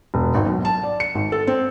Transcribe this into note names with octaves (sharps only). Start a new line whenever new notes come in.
E1
G#1
B1
A5
D5
C#7
G#1
A4
C4